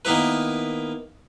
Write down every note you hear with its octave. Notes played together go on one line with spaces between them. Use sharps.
D#3 A#3 B3 E4 B4